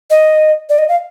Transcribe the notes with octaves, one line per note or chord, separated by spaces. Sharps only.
D#5
D5
D#5
F5